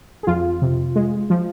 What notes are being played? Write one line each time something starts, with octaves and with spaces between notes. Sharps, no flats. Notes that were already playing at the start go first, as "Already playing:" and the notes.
G#4
F2 F4
C3
G#3
F3